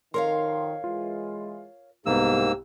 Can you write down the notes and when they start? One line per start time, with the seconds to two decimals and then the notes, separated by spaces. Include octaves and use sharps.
0.14 F2 D#3 A#4 C#5 F5 C6
0.84 E3 G#3 F4
2.06 C2 G#2 A#3 B3 G4 E6